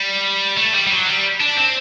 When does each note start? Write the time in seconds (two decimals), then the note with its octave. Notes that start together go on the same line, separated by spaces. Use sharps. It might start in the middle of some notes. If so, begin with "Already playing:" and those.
Already playing: G3
0.57 A3
0.74 G3
0.87 G3
0.91 F#3
1.07 G3
1.41 D4
1.57 C4